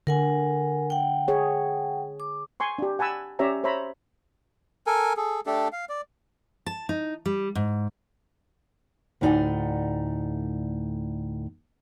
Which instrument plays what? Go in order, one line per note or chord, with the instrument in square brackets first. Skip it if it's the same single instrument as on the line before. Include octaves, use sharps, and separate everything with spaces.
[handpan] D3 [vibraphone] A#4 F#5 G#5
[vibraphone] F#5 G5
[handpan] G#4 C#5
[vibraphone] D6
[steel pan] G#5 C6 C#6
D4 G4
F#5 G#5 A5 B5 E6
C#4 G4 C#5 D5 E5 A#5
C5 C#5 E5 A#5 B5
[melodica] A4 A#4 G#5
G#4 A4
A3 D4 G4 A4
F5
D5
[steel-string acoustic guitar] A5
D#4
G3
G#2
D2 A2 D#4 D5 F#5 G#5